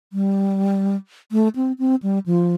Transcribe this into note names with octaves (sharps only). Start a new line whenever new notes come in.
G3
A3
C4
C4
G3
F3